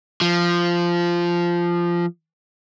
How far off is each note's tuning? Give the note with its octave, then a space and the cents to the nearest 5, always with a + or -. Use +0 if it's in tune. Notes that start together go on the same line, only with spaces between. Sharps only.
F3 -10